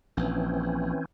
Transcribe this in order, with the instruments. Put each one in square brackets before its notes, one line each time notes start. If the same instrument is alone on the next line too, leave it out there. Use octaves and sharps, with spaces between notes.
[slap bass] A#1 [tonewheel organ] E3 C4 C#4